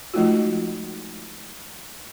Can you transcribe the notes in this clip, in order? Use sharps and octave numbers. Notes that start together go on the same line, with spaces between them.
F3 G#3 A3 D#4 F4 F#4